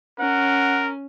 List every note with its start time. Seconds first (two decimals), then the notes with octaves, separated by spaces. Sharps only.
0.19 C#4 A#4 F#5